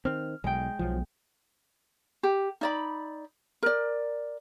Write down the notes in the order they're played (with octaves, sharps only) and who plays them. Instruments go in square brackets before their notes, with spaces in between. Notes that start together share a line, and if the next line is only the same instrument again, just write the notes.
[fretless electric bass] D#3 C4 [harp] F6
[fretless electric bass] B1 [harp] G#3 G5
[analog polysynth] B1 [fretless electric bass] F3 F#3
[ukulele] G4
D#4 D5 B5
A#4 D5